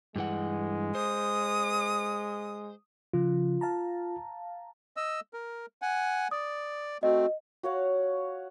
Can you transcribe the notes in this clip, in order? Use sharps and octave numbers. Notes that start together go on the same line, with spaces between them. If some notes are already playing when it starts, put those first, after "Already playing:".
G2 E3 G#3 F#5
C5 D#6
C#3 F3 F4
F5 A5 A#5
D#5 E6
A#4
F#5 G#5
D5 D#6
A3 C4 F#4 D#5
F#4 C#5 F5 F#5